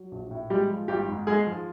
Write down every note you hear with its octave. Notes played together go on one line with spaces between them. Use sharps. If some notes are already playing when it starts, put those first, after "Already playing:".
Already playing: F#3
A#1
A2
G3 G#3 G4
F3
G#1 G3 G4
G#2
G#3 G#4
F3